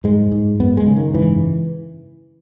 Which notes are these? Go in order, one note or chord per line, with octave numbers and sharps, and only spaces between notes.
G#2 G#3
G#2
F#2 B3
G#3
C#3
D#3
G#2 E3